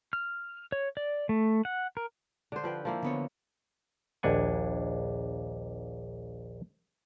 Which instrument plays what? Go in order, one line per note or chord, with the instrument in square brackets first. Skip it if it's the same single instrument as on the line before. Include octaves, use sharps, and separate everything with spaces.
[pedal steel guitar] F6
C#5
D5
A3
F#5
A#4
[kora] D3 C5
F3 B4 G5
F3 A#3 E4
[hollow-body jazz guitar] D3 B3 C#5
[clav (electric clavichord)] A#1 D#2 D4 F#5 G#5